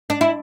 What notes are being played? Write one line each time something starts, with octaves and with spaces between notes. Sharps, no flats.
D4
E4